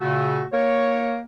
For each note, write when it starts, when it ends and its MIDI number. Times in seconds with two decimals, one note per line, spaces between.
0.01 0.43 46
0.01 0.43 49
0.01 0.43 57
0.01 0.45 66
0.53 1.21 58
0.53 1.15 73